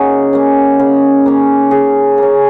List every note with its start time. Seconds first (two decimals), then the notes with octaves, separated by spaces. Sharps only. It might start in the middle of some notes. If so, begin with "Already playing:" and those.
Already playing: C#3 A#3 C#4 D#4 F#4 G#4
0.33 A#3 C#4
0.79 C#3
1.26 A#3 C#4
1.71 C#3 G#4
2.18 A#3 C#4